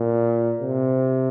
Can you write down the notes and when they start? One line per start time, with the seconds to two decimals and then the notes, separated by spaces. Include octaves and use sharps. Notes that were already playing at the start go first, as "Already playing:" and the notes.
Already playing: A#2
0.62 C3